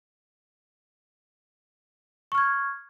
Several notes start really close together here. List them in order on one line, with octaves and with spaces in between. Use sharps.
C#6 F6 G#6